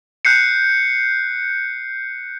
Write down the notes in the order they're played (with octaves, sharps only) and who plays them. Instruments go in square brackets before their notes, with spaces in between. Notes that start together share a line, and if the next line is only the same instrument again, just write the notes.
[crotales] F#6 G6 C7 C#7